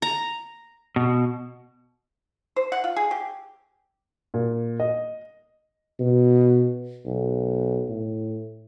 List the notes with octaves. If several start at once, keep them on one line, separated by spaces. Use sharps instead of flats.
A#5
B2
C5
F#5
F4
G#4
G4
A#2
D#5
B2
B1
A2